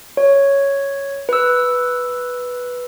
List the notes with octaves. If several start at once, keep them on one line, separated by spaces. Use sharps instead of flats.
C#5
B4 E6